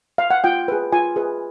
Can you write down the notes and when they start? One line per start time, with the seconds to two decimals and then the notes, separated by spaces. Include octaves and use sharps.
0.18 F5
0.30 F#5
0.44 F4 G5
0.68 G#4 B4
0.92 F4 G#5
1.16 G#4 B4